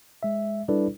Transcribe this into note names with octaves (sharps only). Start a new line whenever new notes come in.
G#3 E5
G3 D4 E4 A4 B4 D5